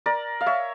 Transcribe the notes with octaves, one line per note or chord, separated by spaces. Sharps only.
A#4 D5
F5
C#5 E5